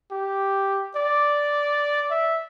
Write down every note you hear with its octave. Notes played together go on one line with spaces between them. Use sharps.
G4
D5
E5